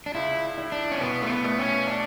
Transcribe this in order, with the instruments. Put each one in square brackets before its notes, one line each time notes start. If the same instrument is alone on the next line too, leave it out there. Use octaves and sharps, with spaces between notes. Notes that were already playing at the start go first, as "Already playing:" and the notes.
[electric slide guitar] D4
[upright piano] C#2 [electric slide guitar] E4
[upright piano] E4
[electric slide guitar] D4
C#4
[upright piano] B2 [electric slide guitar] B3
[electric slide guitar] A3
B3
[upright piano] A3
[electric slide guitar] C#4
D4